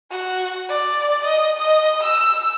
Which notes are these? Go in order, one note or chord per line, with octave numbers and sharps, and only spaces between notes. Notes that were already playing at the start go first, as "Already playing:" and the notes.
F#4
D5
D#5
D#5
E6